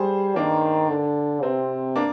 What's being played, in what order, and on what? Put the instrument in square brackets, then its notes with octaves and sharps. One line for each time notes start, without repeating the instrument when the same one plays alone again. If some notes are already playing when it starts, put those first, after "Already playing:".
Already playing: [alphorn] G3 [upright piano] G#4 C5
[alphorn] D#3 [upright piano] A#3 D4
[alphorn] D3
[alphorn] C3 [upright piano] C4
[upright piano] A#3 D4